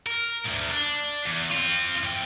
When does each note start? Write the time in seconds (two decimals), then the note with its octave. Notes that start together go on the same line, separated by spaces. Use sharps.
0.06 A#4
0.45 D2 G#2
0.71 D4
1.26 E2
1.51 C4 F4
2.03 E2 G5